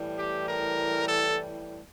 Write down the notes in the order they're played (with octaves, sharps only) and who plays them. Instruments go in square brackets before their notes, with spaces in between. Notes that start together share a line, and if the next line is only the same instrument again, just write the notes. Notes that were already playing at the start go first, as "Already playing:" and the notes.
Already playing: [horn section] A2 E3 G3
G4
A#4
A4